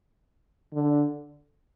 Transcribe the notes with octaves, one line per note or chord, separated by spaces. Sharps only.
D3